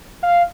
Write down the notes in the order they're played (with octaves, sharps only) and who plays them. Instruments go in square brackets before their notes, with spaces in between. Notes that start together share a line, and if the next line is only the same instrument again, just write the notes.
[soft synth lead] F5